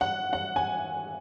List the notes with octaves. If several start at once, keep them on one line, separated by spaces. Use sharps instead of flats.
F#5
F#5
G#5